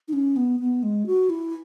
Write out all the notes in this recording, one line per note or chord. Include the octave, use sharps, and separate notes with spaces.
D#4
C#4
B3
B3
G#3
F#4
E4